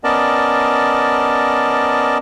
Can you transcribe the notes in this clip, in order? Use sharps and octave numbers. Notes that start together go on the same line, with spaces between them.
B3 C#4 A#4 D5 D#5 A5